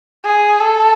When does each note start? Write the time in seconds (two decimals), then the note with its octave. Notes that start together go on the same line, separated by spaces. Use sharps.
0.25 G#4
0.60 A4